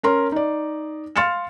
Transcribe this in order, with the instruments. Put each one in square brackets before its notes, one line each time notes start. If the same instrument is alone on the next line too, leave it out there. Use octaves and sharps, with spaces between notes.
[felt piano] C#4 A#4 C6
D#4 D5
F5 C6 F6 A6 C#7 E7